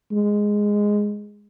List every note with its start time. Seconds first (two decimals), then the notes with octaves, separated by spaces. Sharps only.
0.12 G#3